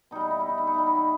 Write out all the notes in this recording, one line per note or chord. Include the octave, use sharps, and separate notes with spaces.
B2 G3 D#4
E4
D#4
E4
D#4
E4
D#4
B2 G3 E4
D#4
E4